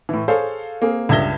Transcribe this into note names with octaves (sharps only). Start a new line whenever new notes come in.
A2 E3
G#4 A4 C5 C#5 F5
A#3 C4 G#4
C#2 G2 E5 G#6 A#6 G7